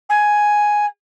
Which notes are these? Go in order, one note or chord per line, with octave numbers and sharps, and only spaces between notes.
G#5